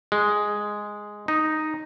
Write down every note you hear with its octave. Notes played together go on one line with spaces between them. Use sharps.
G#3
D#4